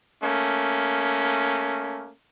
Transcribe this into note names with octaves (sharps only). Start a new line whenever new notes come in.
A3 A#3 C#4